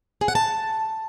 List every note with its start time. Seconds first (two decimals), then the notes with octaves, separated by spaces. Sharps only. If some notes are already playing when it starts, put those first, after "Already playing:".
0.21 G#4
0.28 F#5
0.35 A5